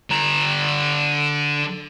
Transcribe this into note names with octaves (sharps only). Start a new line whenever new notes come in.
D3 A#5